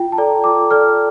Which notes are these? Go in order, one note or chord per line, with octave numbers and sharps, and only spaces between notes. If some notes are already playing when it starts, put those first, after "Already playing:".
Already playing: F4 G5
A5
A4 D5 A#5
F4 D6
A4 D5 F6